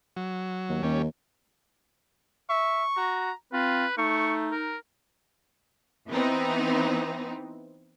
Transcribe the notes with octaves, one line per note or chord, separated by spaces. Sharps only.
F#3
D#2
D#2 G3 C#4
E5 C#6
F#4 A#5
C4 F4 B4
A3 D#4 C#6
A#4
E3 B3 C4 D#4